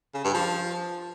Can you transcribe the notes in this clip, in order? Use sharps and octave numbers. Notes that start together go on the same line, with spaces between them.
C#3
G2
F3